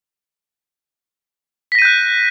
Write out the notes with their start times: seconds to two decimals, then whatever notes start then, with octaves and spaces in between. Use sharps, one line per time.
1.72 B6
1.75 A#6
1.79 D#7
1.82 G6
1.85 F#6